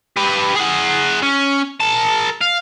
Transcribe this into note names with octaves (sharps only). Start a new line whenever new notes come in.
G4 B4
G#4 F#5
C#4
A#4 A5
F5